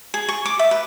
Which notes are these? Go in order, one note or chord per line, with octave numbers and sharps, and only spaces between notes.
G#4
C#6
D6
E5
B4